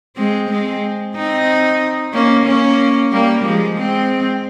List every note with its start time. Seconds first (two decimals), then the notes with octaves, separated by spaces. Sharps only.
0.17 G#3 C4
0.50 G#3 C4
1.15 C4 D#4
2.13 A#3 C#4
2.46 A#3 C#4
3.12 G3 A#3
3.45 F3 G#3
3.79 G#3 C4